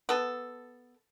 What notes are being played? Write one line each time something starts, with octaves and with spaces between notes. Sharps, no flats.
B3 A4